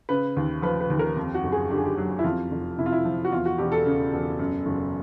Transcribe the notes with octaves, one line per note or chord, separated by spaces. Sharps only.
C#3 B4
D#2
F3 B4
B4
D#2
A#4
F2
F#4
F#1
G#4
D3 G4
G#4
G4
F#3
E4
F2 F4
F1
C3 E4
F4
E4
F3
F#4
E2 F4
F#4
E1 G4
A4
C#3
E1
F#2
F#1